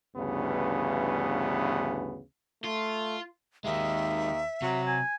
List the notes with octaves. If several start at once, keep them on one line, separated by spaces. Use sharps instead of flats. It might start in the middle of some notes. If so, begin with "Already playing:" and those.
D2 G2 C#3 E3 B3
A3 F4
D#2 D#3 G#3 E5
C3 F#3
G#5